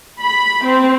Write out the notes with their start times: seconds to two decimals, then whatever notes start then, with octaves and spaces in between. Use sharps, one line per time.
0.20 B5
0.65 C4